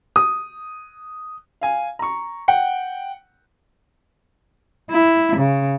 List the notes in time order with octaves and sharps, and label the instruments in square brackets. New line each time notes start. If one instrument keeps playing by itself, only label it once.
[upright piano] D#6
F5 G#5
A#5 C#6
F#5 G5
[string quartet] E4
C#3